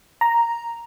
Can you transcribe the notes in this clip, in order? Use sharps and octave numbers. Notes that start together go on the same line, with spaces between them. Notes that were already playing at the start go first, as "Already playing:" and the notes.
A#5